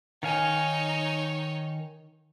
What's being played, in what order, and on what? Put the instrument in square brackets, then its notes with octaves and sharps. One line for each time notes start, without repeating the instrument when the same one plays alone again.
[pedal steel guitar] D#3 F5 G#5 [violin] D#4 C#5